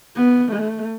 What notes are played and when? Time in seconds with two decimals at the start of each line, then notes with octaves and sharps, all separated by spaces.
0.16 B3
0.52 A3